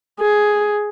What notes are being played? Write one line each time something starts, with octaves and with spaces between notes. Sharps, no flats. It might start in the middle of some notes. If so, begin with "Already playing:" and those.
G#4